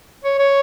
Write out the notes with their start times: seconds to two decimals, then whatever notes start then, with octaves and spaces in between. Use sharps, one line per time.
0.24 C#5
0.39 C#5